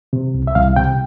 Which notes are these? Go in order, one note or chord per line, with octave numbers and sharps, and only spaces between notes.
C3
C2
E5
C2 F5
C3 G5